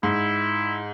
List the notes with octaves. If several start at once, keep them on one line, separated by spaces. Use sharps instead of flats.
G#2 E4